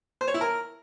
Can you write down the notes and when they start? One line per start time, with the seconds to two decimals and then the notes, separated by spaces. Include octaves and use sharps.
0.21 C5
0.28 C#5
0.34 E4
0.41 A#4